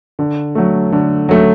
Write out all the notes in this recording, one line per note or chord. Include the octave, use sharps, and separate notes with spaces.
D3
F#3 A3
D3
F#3 A3